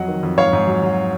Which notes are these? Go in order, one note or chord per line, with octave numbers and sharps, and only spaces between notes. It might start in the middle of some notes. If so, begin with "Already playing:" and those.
Already playing: F2 F#3 D#5 F#5
D#3
F2
G#2 C#5 F5
G#2
F#3
F#3